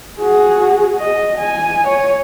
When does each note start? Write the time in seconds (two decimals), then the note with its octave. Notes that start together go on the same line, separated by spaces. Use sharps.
0.20 F#4 G#4
0.98 D#5
1.38 G#5
1.87 C#5